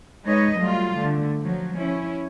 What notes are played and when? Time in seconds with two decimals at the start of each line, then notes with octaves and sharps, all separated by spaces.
0.25 G#3 D#4 B4 C#5 D#5
0.58 F#3 G3 A3 F4
0.95 D3 A3
1.39 F3 F#3
1.77 C#4 E4